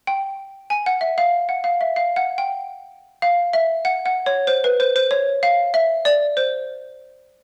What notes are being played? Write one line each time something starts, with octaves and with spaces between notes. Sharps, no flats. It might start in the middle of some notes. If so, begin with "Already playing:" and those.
G5
G#5
F#5
E5
F5
F#5
F5
E5
F5
F#5
G5
F5
E5
F#5
F#5
C#5
C5
B4
C5
C5
C#5
F5
E5
D5
C5